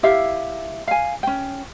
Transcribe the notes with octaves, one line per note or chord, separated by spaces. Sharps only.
E4 G4 E5 F5
F5 G#5
C#4 G5